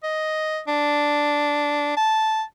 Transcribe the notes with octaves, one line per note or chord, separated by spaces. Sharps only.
D#5
D4
A5